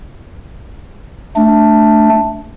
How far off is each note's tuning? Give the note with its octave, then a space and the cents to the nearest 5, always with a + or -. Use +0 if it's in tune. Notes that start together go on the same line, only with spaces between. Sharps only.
A3 -5 D4 +5